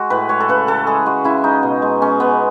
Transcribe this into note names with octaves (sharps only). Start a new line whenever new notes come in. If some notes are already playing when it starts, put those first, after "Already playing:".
Already playing: G#3 F#4
A2 B4
G#3 C#5
A4
C#3 B4
C#3 A4
G#3 G#4
G#3 F#4
C#3 E4
G#3 D#4
B2
G#3
G#3 C#4
G#3 B3